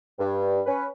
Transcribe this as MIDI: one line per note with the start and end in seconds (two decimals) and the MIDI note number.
0.19 0.60 43
0.66 0.84 61
0.66 0.84 71